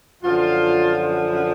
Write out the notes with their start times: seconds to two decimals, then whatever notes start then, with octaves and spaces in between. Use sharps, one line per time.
0.23 F#2 D3 F3 F4